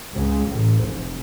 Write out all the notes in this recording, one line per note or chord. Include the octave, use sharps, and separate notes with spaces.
C#2
A1
F1